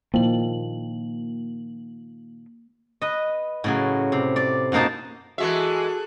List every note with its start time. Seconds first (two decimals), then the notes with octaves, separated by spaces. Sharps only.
0.14 A#2 D#3 F3 A#3 F#7
3.02 B4 D#5
3.64 A2 C#3 F#3
4.12 C3
4.36 D5
4.72 F#2 B2 A#3 D#4 A5
5.38 E3 G#3 F#4 G#4 A4 E5 F#6